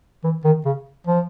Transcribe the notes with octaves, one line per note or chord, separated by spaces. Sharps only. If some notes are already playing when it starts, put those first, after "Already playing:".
E3
D#3
C#3
F3